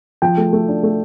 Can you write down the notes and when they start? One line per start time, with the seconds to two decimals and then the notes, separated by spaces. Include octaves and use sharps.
0.22 F3 G5
0.37 A3
0.53 A3
0.68 D4
0.83 A3